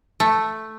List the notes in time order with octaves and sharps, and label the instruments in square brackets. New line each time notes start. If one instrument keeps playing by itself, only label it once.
[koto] A3